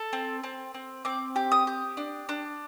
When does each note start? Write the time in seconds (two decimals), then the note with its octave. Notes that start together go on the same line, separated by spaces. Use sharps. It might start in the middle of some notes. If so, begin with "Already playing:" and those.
Already playing: A4
0.13 C4
0.44 C4
0.74 C4
1.05 C4 D6
1.36 G4
1.52 D#6
1.67 G4
1.97 D4
2.29 D4